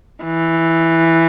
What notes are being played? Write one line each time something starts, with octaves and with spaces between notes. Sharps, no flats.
E3